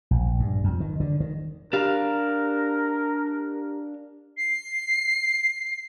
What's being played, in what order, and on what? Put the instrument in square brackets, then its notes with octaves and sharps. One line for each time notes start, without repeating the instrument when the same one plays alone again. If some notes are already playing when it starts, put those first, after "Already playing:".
[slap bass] A#1
G2
F2
D#3
D3
D#3
[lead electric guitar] D4 F5 [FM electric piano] G4 A#5 [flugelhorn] A#4
[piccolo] C7